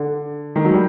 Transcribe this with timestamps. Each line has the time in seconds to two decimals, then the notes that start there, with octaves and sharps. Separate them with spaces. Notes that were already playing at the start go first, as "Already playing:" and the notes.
Already playing: D3
0.56 D#3
0.65 F#3
0.73 G3